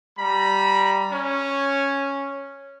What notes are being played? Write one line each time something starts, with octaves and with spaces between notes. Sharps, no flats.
G3 A#5 B5
C#4 C#5